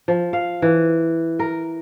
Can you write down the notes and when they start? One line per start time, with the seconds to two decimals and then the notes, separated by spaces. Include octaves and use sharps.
0.08 F3
0.33 F5
0.62 E3
1.39 A#4